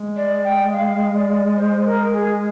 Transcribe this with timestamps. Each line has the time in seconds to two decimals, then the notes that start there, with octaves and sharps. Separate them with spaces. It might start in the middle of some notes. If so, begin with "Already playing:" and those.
Already playing: G#3
0.17 D5
0.44 G5
0.72 F5
1.14 D5
1.57 C5
1.85 A#4
2.13 G#4